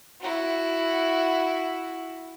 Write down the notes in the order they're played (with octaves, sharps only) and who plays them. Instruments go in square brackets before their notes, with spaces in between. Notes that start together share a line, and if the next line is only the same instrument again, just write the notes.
[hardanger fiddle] E4 F#4